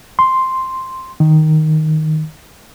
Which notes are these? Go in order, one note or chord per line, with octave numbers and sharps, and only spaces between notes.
C6
D#3